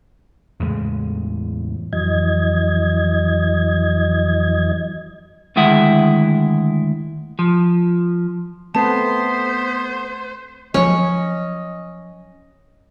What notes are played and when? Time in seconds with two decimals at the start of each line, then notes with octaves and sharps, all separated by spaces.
0.60 E2 A2 C#3 G#3
1.93 F2 E3 F#3 D#5 G#6
5.56 D2 D#3 G#3 E4 E5 F#5
7.39 F3
8.75 A3 B3 C4 B4 C5 A5
10.74 F3 F#3 C#4 D#5